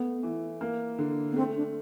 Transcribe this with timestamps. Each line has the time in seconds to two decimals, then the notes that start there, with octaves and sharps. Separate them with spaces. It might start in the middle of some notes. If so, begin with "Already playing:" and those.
Already playing: A3 B3
0.23 E3
0.61 A#3
0.99 D3
1.32 B3
1.36 A3 C4
1.56 D4